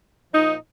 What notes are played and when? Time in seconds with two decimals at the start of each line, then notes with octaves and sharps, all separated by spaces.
0.33 A#2 F3 D#4